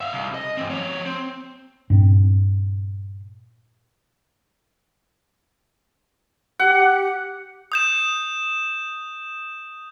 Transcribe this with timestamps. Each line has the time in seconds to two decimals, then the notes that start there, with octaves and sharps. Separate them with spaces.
0.01 E5 F5
0.13 C2
0.34 D#5
0.57 E3 C4
0.70 F3 C#5
1.06 C4
1.90 G2 A#2 C4
6.59 G4 F#5
7.72 D#6 G6 E7